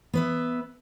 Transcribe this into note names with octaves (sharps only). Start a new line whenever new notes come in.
B3 B4 E5